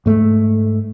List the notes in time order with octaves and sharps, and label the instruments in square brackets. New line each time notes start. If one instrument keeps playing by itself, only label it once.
[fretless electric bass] G#2 A3